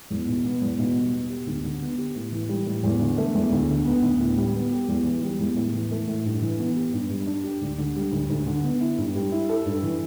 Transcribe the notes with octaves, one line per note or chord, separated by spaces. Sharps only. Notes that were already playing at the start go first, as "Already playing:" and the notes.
E2
B2
B3
E2
B2
G3
B3
G4
D2
D3
B3
G4
A2
E3
G3
A2
E2
D3
A3
E2
D2
D3
B3
D2
A2
G3
B3
G4
E2
E3
G3
E2
A2
E3
A3
A2
G2
E3
B3
G4
G2
G3
D4
G4
D2
D3
G3
D2
D2
D3
B3
E4
G2
G3
E4
A4
G2
E3